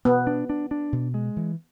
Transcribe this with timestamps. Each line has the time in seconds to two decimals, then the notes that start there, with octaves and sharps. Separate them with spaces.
0.05 B2 B3
0.27 D4
0.50 D4
0.71 D4
0.92 B2
1.14 G#3
1.36 E3